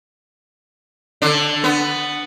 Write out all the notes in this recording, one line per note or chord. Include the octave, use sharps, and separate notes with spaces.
D3 D4
B3